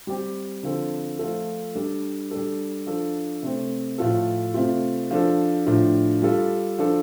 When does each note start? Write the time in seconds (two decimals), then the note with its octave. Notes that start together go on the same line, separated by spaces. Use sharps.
0.07 G3 C4 G4
0.63 D3 F3 C4 A4
1.19 F3 A3 F4 A4
1.75 G3 D4 A4
2.31 G3 D4 A4
2.87 F3 D4 A4
3.43 C3 A3 C4
3.98 A2 F3 A3 F4 A4
4.54 C3 A3 C4 F4
5.11 F3 D4 A4
5.66 A2 F3 D4 F4
6.22 G3 F4 A4
6.79 F3 D4 A4